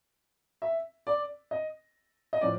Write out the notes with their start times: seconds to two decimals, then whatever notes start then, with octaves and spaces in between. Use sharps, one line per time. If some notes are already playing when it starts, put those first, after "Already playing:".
0.62 E5
1.07 D5
1.51 D#5
2.33 D#5
2.41 A2 F3 D5